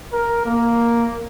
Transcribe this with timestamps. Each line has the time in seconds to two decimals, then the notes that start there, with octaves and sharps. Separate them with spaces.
0.12 A#4
0.45 A#3